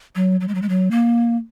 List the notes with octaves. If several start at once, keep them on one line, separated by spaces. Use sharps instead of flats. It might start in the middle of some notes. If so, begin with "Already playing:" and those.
F#3
F#3
G#3
F#3
G#3
F#3
A#3